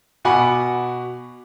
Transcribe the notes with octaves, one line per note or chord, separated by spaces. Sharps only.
B2 F#5 G#5 B5 D6